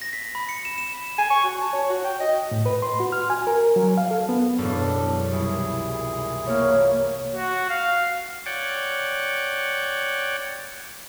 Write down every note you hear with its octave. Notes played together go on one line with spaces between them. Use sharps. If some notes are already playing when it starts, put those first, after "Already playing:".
A#6
B6
B5
C#7
E7
E7
G#5
C#6
F#4
A5
C#5
F#4
G5
D#5
A2
B4
C6
F#4
F6
G#5
A#4
F#3
F5
A4
B3
E1 F#2 D4 A4
C2 A#2 E4 G#4
A3 A#3 C#5 F6
F#4
F5
C#5 D5 F#5 G5